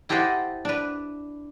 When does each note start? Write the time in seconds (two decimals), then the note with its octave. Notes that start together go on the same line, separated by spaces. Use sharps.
0.09 E4 G4 A4 C5 D#5 F#5
0.65 D4 B4